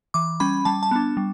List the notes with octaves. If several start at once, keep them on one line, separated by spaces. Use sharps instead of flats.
E3 D6
G3 C#4 B5
G3 A5
A5
B3 D4
G3